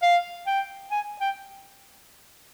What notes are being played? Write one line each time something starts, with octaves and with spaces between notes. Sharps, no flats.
F5
G5
G#5
G5